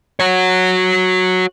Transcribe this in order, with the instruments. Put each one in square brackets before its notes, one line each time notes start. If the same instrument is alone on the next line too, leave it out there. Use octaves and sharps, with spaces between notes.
[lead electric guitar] F#4 C#5